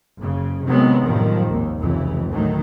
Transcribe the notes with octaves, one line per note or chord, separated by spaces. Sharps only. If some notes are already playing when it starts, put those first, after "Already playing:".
F#1 C#3
C3 D#3 F#3 G#3 B3
F#2 A2 D#3 F3 G3
G#1 D#2
F1 C#2 E3
D2 A2 D#3 F#3 A3